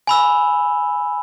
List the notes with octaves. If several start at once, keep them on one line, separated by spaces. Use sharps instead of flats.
G#5 B5 E6